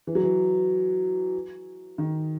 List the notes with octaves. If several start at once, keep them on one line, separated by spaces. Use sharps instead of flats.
E3
F#3
E3
D#3